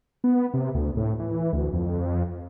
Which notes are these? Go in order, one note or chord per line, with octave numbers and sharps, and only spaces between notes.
B3
C3
D2
A2
E3
D2
F2